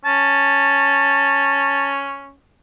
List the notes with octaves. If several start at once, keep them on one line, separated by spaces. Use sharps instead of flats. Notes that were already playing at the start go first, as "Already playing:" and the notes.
C#4 A5